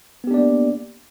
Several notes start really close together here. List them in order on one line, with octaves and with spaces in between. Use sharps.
B3 G4 D4 D5 A#3